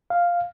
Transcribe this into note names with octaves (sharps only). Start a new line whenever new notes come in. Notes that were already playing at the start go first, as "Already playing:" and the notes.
F5